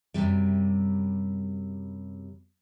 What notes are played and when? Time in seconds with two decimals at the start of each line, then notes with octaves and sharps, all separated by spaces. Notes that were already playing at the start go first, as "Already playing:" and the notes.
0.14 F#2 A2 C3 G3